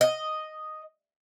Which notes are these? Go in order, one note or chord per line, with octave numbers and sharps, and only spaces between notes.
D#5